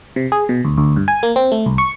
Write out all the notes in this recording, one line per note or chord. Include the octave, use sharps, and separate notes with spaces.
C3
G#4
B2
D2
D2
G2
G#5
A#3
C4
A3
C2
C#6